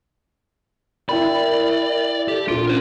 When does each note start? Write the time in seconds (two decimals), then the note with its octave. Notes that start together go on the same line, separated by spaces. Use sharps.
1.09 E4 A#4 D5 G5 B5
2.28 G4 A4
2.48 A#2 D4 F4 D7
2.67 C#4 A#4 C5